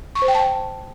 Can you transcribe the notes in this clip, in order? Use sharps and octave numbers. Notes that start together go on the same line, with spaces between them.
C#6
C5
G5
A5